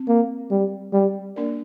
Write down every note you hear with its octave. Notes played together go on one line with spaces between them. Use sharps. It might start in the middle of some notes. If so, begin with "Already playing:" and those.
Already playing: C4
A#3
G3
G3
A#3 D4 A#4 D5